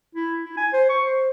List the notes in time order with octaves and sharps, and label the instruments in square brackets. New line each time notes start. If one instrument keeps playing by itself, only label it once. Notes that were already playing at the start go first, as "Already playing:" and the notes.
[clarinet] E4
E4
G#5
C5
C#6
C5